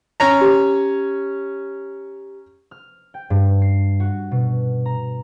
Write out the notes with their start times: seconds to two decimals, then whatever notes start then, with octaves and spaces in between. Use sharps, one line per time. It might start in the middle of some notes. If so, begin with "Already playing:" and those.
0.20 C#4 C#5 A#5
0.41 G4
2.71 F6
3.14 G5
3.30 G2
3.62 C7
4.00 F#4
4.31 B2
4.86 A#5